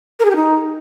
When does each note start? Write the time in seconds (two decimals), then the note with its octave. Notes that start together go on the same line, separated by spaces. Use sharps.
0.20 A#4
0.25 G#4
0.30 G4
0.36 D#4